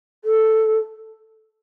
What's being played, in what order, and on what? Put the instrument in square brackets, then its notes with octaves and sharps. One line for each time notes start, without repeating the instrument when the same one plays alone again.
[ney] A4